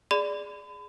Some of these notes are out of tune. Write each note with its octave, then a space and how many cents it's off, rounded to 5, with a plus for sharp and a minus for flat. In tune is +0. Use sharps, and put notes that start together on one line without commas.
G#4 +0 D5 +0 B5 +35